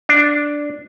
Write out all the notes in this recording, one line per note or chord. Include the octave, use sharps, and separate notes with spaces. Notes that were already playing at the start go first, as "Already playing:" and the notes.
D4